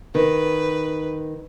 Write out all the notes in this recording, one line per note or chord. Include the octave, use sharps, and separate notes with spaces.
D#3 B4